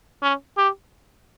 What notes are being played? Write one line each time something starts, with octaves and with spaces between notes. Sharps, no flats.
C#4
G4